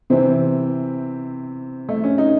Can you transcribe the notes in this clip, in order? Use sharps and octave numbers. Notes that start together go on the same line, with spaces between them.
C3 E3 C4
A3
C#4
D#4